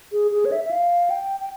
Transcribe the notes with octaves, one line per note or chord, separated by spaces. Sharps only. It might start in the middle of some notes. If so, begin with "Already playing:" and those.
G#4
G#4
C#5
E5
E5
F5
G5
G5